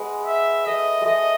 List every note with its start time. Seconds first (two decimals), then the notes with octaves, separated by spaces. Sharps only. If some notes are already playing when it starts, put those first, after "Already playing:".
Already playing: G#3 B3
0.26 E5
0.66 A3 D#5
1.01 G#3 A3 D#5